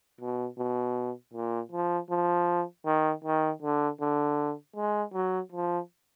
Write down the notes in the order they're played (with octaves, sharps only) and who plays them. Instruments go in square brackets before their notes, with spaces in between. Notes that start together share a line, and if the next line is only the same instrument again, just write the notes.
[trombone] B2
B2
A#2
F3
F3
D#3
D#3
D3
D3
G#3
F#3
F3